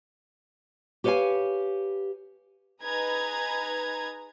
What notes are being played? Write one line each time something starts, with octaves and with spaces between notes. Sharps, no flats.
G4 B4 C#5 D#5 F5 G#5
D#4 G#4 B4 A#5 G#6